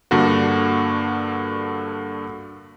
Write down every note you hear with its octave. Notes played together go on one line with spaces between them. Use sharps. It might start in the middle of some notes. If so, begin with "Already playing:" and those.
G2 D3 A#3 D4 F#4